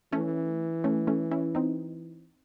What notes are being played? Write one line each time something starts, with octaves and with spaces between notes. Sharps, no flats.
E3 A3 C#4
A3 C#4
A3 C#4
C#4 E4
C4 D#4